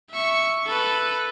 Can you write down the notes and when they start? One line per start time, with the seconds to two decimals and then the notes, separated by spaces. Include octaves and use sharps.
0.11 E5 C#6
0.66 A4 B4